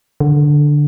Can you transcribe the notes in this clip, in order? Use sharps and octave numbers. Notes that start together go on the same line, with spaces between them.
D3